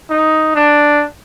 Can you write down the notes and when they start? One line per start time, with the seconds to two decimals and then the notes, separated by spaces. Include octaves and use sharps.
0.10 D#4
0.56 D4